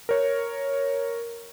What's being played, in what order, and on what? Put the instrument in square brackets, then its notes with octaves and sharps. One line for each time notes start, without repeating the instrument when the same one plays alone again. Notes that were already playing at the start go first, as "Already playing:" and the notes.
[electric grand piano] A#4 C#5